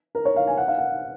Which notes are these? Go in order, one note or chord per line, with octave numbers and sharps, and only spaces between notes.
A#4
C#5
F5
G#5
F#5
F5
F#5